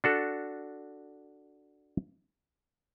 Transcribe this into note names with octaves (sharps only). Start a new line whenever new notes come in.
D4 F#4 A4